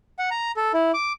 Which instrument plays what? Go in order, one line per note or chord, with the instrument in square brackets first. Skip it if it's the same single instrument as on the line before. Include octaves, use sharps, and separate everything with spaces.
[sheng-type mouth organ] F#5
A#5
A4
E4
D6